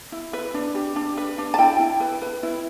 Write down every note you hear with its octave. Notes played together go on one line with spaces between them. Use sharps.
E4
B4
D4
G4
D4
B4
D4
A5
E4 G5
E4
B4
B4
E4